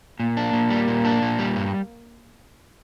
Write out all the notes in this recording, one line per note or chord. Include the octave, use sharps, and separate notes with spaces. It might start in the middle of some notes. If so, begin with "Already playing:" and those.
A#2 A#3
D4
A#2
G3
A#2
D4
A#2
G3
G2